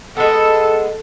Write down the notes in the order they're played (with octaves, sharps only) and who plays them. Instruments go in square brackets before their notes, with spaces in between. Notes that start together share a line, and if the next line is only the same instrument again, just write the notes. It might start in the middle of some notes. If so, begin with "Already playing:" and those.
[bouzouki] G#3 B3 [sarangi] A4